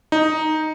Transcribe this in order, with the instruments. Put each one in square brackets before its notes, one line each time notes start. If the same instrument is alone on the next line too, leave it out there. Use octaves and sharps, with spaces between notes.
[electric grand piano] D#4